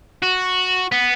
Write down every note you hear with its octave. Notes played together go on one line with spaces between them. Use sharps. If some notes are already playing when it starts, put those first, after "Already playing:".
F#4
B3